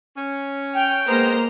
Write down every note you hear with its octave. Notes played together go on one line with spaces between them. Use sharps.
C#4
G5 F6
G#3 A#3 B3 C5 A#5 F6